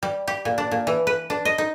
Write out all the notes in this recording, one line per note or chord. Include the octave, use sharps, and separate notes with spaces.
G3
G4
A#2
D4
A#2
E3
B4
D4
D#5
D#4